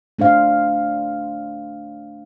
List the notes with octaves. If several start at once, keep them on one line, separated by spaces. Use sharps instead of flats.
A3 D4 C5 F5